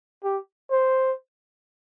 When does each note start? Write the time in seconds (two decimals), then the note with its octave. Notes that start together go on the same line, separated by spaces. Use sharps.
0.24 G4
0.71 C5